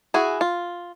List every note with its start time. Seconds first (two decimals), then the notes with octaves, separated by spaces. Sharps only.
0.14 E4 F#4 G#4
0.41 F4